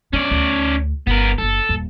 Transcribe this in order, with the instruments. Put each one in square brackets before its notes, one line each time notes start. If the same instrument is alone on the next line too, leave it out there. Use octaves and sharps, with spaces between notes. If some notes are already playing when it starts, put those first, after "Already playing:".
[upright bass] F#3 D4 [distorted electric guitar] C#4 D5
[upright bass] D2
[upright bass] G1 [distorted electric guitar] B3 A#4
[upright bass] F#1 D4 [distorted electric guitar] A4
[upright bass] D#1 G2